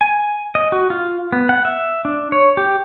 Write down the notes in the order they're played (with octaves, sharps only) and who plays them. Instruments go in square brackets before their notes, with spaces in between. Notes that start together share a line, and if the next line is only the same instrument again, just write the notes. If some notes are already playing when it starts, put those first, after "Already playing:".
[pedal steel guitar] G#5
D#5
F#4
F4
B3
F#5
E5
D4
C#5
G4